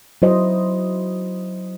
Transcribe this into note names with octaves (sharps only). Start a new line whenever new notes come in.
F#3 E4 C5 D#5